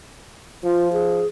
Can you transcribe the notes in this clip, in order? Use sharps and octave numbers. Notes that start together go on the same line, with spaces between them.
F3 F4
G#4